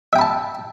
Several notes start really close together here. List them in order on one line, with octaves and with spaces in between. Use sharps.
E5 G5 B5 A5